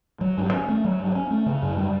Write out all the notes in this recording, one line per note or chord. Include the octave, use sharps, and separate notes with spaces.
F#3
G2
C#4
A3
F#3
G2
C#4
A3
C#3
F#2
G3